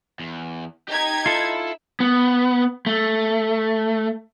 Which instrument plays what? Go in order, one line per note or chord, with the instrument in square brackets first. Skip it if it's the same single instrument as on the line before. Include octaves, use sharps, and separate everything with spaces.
[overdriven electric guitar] E2
[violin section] D#4 G#6 [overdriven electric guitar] G4
[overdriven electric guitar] E4 E5 [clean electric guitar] F4 A4
[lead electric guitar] B3
A3